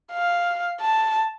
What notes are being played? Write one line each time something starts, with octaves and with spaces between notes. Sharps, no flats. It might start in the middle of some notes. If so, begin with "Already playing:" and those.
F5
A5